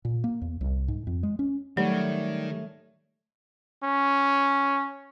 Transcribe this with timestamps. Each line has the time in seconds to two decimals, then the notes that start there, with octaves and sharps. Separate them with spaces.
0.05 A#2
0.24 A#3
0.42 E2
0.61 C2
0.88 G#2
1.07 F2
1.23 G#3
1.39 C#4
1.77 D#3 F#3 G3 A3 C#5
3.84 C#4